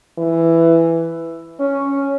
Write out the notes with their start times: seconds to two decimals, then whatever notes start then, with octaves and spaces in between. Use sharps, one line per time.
0.19 E3
1.60 C#4